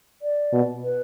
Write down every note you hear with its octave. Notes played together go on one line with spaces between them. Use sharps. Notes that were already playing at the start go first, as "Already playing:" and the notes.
D5
B2
B4